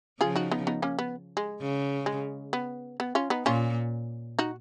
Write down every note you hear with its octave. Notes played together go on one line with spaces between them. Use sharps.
C#3 F3 F4 G#4
D#4 F#4
B3 D#4
B3 D#4
A#3 C#4
B3
G#3
C#3
G#3
B3
B3
C#4 F4
B3 D#4
A#2 C#4 F4
D#4 F#4